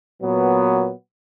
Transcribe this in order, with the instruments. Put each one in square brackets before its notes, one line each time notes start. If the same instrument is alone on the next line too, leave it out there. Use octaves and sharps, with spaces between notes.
[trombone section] A#2 F#3 B3